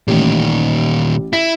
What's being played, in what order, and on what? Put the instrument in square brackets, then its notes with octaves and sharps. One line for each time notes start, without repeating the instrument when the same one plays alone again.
[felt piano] A1 [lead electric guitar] A#2 D#3
[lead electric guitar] E4 [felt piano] B6